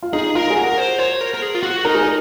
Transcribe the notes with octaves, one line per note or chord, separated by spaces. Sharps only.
F4
D#4 G#4
F4 A#4
G#4
F#4 A#4
C5
C5 C#5
A#4
A#4
G#4
F4
F#4
D#4 A#4
G#4
A#4